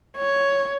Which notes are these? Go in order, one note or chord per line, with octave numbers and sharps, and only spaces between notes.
C#5